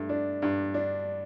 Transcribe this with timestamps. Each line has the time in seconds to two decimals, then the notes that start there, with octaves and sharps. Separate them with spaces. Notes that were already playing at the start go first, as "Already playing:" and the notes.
Already playing: G2 A3
0.09 D4
0.42 G2
0.74 D4